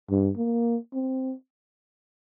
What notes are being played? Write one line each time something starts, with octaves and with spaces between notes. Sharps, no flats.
G2
A#3
C4